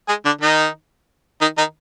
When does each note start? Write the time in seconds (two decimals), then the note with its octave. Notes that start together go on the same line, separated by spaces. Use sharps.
0.08 G#3 G#4
0.25 D3 D4
0.41 D#3 D#4
1.41 D#3 D#4
1.58 D#3 D#4